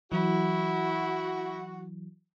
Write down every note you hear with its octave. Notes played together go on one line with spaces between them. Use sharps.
E3 F#3 E4 F#4